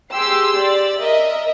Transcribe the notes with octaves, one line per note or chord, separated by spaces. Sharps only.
G4 G#4 C6 E6
D5
A#4 D#5 E5